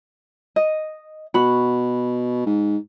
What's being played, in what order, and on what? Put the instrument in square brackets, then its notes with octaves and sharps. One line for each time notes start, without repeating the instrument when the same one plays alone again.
[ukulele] D#5
[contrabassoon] B2 [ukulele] F#4 B5
[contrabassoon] G#2